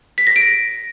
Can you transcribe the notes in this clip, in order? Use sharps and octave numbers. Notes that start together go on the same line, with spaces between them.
B6
A#6
D7